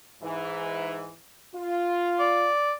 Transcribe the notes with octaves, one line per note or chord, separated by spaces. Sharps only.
G#2 E3
F4
D5